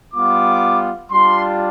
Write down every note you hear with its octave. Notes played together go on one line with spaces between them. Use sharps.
G3 B3 F4 D6
G3 D4 F4 C6